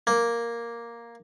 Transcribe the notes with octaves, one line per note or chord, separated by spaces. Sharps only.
A#3